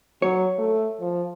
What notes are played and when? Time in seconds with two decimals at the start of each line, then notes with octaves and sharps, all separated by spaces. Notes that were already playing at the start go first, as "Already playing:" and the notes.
0.22 F#3 C#5
0.59 A3
1.00 F3